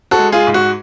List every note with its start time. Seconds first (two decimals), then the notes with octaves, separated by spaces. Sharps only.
0.11 F#4 A4
0.18 G#3
0.32 F4 G#4
0.47 G#2
0.54 F#4